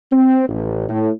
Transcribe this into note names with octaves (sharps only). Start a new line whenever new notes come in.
C4
A1
A2